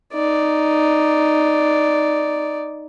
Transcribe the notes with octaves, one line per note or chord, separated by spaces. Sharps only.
D#4 D5